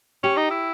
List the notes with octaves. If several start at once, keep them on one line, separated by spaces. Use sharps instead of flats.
C#4 G4
D#4
E4